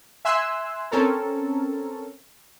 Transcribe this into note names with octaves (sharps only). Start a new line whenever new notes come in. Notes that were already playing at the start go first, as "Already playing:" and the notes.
E5 G#5 C6 E6 F#6
C4 C#4 A4 A#4